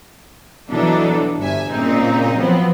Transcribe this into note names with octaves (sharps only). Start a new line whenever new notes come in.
B2 E3 F#3 D4 D#4 A4
G1 G2 E5 G#5
A#2 C#3 C4 D#4
F3 F#3 B3 C4